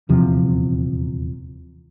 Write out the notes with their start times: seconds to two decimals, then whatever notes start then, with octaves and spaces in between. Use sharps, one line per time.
0.09 D#1 E2 C3 F3